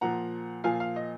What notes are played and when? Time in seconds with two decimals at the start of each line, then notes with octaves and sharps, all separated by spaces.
0.01 A#2 F3 F#5 A#5
0.64 A#2 F3 F5 G#5
0.80 F5
0.96 D#5